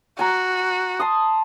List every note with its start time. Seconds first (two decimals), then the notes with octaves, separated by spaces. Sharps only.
0.19 F#4 G#5 A#5
1.00 A5 C6 D#6